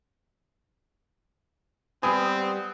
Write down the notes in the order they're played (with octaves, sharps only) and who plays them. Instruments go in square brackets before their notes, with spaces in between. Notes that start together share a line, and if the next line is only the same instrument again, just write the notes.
[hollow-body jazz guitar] G3 G4 G#5 [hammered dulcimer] B3 [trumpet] C4 [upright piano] D#6